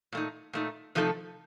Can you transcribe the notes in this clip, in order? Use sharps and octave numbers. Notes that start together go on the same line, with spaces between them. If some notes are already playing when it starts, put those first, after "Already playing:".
A#2 A3 D#4
A#2 A3 D#4
C3 F3 A3 D#4 A4